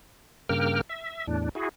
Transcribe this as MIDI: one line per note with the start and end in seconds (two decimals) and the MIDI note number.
0.49 0.81 43
0.49 0.81 49
0.49 0.81 58
0.49 0.81 70
0.49 0.81 79
0.49 0.81 89
0.89 1.26 76
1.28 1.49 40
1.28 1.49 45
1.28 1.49 62
1.55 1.69 64
1.55 1.69 66
1.55 1.69 68